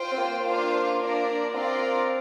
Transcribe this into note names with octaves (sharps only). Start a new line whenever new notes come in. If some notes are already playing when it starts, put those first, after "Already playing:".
Already playing: F4 C5 G5
C4
A#3
D4 F4 C5 F5
D4 A#4 D5
C4 F4 A#4 D5 F5